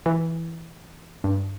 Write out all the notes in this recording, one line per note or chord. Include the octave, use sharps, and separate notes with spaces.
E3
G2